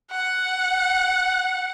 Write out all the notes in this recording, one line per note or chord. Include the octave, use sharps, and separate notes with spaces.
F#5